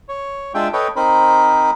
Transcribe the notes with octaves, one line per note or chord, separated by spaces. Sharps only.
C#5
G#3 D4 F4 E5 G5
A4 B4 C#5 D#5 G5
C4 D#4 A#4 C5 B5